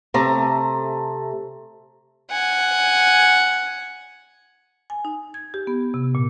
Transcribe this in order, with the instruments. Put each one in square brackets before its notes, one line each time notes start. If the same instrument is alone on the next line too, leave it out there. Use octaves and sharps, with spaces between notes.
[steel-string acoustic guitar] C3 A3 A#5
[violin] F#5 G#5
[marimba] G#5
D#4
G#6
G4
B3
C3
A#2